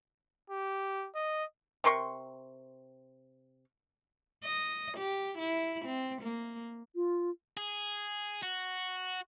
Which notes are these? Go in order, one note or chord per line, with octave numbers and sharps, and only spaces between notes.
G4
D#5
C3 A#4 C6 C#6
D#5
G4
E4
C4
A#3
F4
G#4
F#4